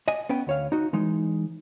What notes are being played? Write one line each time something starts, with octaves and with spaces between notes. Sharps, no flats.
D5 D#5 G#5
B3 C#4 B4 G5
D2 C#5 F5
D#4 F#4
E3 G#3 D#4